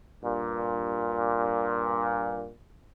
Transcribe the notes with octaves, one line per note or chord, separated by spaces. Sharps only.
G2 A#2